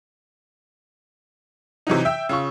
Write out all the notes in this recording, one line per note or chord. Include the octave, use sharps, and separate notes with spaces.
C3 E3 F#3 D#4
E5 G5 E6
C#3 F4 C#6